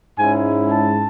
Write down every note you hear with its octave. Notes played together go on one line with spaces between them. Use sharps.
G#2 G#3 C#4 E4 G#5
A5